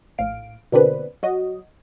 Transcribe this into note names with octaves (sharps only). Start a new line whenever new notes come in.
A#1 A2 F5 D7
B2 D3 A#3 C4 D4 B4
F#3 F#4 D#5